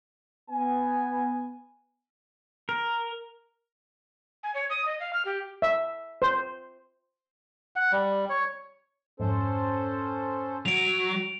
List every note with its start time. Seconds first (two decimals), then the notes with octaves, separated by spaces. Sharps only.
0.50 B3 G#5
2.69 A#4
4.43 G#5
4.55 C#5
4.70 D#6
4.86 D#5
5.00 F5
5.13 F6
5.25 G4
5.62 E5
6.22 C5
7.76 F#5
7.92 G3
8.30 C#5
9.20 F2 G#2 C#4 A4 C5
10.66 F#3 D7 F7